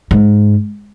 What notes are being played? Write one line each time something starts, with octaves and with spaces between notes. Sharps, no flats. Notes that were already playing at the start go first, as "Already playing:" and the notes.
G#2